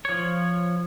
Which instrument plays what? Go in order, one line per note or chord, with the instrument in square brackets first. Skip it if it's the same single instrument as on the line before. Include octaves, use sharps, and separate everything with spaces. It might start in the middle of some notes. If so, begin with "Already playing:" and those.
[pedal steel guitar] F3 C#5